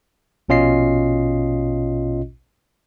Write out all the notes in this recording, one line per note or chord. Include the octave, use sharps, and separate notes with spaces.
A#1 B2 C#4 F4 D#5 C7